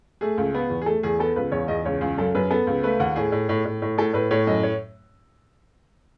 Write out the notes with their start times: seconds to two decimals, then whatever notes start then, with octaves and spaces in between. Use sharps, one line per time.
0.21 A3 G#4
0.38 C#2
0.55 B3
0.70 E2
0.82 G#4
0.86 A3 A4
1.03 E2 G#4
1.19 B3 A4
1.36 C#2 B4
1.52 E2 C#5
1.68 E2 D#5
1.85 C#2 C#5
2.01 C#2 G#4
2.18 F#2 A4
2.35 F#2 B4
2.51 B3 A4
2.67 C#2
2.83 A3 B4
3.00 D#2 F#5
3.16 A2 G#4
3.32 A2
3.49 A2
3.65 A2
3.82 A2
3.98 A2 A4
4.14 A2 B4
4.31 A2 C#5
4.47 F#2 D#5
4.63 C#5